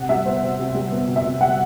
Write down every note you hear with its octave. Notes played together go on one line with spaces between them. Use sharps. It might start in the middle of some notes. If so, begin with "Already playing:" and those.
Already playing: C3 F#5
G3 E5
B3 C5
C3
C3
G3
B3
C3
E5
C3
G3 F#5